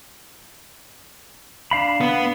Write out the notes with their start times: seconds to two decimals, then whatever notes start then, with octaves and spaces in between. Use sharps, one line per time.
1.71 D4 F5 B5
2.01 B3